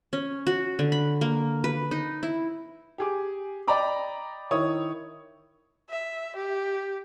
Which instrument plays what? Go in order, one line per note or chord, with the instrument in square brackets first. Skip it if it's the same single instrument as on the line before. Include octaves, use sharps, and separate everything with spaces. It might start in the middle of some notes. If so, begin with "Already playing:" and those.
[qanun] C#4
F#4
D3
B5
A#3
B4
D#4
E4
[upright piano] G4 G#4 D6
D5 D#5 G5 A#5 B5 D6
D#3 E4 C#5 D#6
[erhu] E5
G4